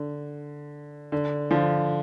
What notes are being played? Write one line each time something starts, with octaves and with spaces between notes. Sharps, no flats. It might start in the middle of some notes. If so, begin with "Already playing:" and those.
Already playing: D3
D3
D3 F3